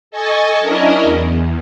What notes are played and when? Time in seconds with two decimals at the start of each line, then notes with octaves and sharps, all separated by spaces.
0.11 A4 D#5 G#5 A5 C#6
0.59 F#3 C#4 D4 E4 A#4 D#5
1.03 E2